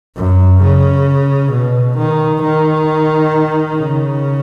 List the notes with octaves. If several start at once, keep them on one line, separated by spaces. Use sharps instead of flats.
F#2
C#3
B2
D#3
D#3
C#3